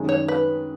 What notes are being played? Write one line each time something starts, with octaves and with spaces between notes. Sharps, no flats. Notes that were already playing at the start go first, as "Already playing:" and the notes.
Already playing: F#2 D#3 G#3
C#5
B4